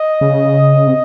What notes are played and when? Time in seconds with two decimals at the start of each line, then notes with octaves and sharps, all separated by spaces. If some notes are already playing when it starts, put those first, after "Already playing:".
Already playing: D#5
0.21 C#3
0.87 C3